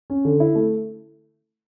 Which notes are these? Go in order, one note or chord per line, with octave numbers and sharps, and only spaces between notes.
C#4
D3
E4
A3